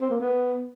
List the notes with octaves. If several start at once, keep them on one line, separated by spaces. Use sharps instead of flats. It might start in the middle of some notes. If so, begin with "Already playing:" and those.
C4
A#3
B3